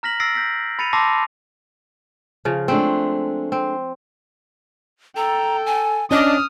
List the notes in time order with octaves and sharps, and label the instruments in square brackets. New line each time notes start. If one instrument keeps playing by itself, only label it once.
[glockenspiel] A#5 F6 A#6 B6 F#7
E6 A6 A#6 C7 D7
G6 A#6 B6
B5 A6 C#7 D#7 F7
A5 C6 D6 E6 A#6 C7
[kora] C#3 F3
[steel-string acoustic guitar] G#3 A3 D4 [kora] C4
[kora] C4
[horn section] A4 [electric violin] G5 [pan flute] A#5
[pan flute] G#5
[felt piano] C#4 [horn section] D4 [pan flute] D#5 [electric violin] D#6 F6